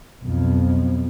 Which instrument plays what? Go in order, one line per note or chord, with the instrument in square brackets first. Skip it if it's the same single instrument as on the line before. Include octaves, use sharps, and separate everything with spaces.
[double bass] B1 F2